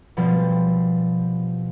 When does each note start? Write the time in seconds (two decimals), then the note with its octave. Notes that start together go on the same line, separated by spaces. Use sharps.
0.17 B2 F3 G3 C4